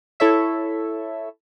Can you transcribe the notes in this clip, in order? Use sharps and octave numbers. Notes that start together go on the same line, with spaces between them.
E4 A4 C#5 E5